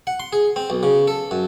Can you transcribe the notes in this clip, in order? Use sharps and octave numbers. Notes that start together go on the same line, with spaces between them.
F#5
C6
G#4
C4
B1
C#3
A4
F#2